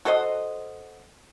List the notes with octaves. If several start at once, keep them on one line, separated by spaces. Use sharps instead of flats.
F#4 A4 C5 D#5